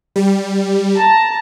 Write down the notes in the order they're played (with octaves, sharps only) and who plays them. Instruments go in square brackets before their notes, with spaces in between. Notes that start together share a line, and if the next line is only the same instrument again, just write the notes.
[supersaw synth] G3
[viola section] A5 A#5